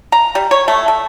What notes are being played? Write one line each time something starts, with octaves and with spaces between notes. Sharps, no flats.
A#5
G3
C#5
A3
A4